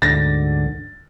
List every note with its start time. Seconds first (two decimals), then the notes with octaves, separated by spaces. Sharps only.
0.02 D2 G#2 D3 A6 A#6